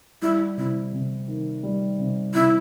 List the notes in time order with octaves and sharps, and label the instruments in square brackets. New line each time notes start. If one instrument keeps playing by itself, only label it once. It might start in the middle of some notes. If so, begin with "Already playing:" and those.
[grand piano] G3 [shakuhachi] E4
[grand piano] C3 [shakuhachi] E4
[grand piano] C3
D#3
G3
C3
[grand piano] C3 [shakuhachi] E4